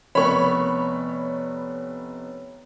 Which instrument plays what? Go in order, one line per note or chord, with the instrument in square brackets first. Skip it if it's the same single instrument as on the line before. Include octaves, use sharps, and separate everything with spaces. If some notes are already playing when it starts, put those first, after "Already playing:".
[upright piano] F1 B3 [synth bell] C#5 [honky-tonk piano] B5 C#6